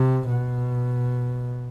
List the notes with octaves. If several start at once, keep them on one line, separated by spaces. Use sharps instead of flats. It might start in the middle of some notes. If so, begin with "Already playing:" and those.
Already playing: C3
B2